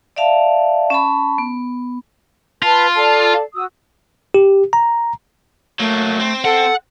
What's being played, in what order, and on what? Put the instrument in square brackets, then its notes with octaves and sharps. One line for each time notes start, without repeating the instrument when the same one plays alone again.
[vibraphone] D5 E5 F5 A5
C#4 A5 B5
B3
[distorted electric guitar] F4 [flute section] B4 A5
[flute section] A4 D5 A5
F#4 D#6 E6
[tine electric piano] G4
A#5
[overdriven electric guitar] F#3 A#3 [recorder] A3
[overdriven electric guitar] C4
[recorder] A4 [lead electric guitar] F#5